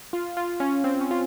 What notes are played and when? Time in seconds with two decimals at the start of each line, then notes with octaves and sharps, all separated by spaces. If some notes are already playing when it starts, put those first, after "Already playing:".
0.13 F4
0.37 F4
0.60 C#4
0.84 C4
1.01 C#4
1.11 F4